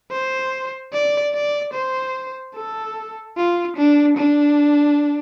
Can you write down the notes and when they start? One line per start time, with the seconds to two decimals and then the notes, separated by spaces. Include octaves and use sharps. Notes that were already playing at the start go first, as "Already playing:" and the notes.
0.11 C5
0.93 D5
1.34 D5
1.74 C5
2.55 A4
3.37 F4
3.77 D4
4.18 D4